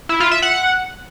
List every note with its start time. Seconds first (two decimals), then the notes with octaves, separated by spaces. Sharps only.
0.09 E4
0.20 F4
0.31 E5
0.42 F#5